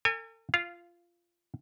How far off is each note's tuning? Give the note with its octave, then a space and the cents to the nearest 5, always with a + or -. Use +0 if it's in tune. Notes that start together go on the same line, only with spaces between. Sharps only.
A4 +45 G#5 -25
F4 -15 F5 +0